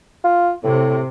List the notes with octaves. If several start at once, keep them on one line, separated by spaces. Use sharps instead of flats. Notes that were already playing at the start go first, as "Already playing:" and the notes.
F4
A2 C3